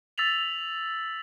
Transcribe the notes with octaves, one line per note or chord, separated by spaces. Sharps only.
E6 A6 B6 F7 F#7